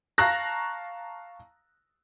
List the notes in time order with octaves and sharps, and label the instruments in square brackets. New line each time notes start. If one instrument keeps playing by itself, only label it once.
[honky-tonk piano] F5 A5 A#5 C#6 F#6 A#6